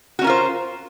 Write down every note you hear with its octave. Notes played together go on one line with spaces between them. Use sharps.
C#4 F4 F#4 A#4 C5